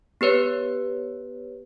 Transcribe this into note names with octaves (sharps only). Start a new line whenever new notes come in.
B3 G4 B4 C#5